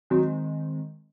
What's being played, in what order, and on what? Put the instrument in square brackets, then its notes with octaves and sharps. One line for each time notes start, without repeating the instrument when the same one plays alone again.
[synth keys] D#3 G#3 C4 [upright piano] F#3